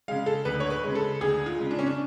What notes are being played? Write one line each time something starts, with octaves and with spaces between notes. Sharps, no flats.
C#3 G#3 F5
A4
D2 B4
C#5
B4
C#3 G#3
A4
D2 G#4
F4
C#3 G#3
D4
C#4
D4